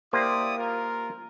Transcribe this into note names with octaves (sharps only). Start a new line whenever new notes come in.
A#3 E4 G4 C5 D5 D#6
F4 A#4